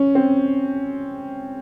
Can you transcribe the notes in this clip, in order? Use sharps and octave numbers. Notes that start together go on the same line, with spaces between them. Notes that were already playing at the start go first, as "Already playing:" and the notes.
Already playing: C#4
C4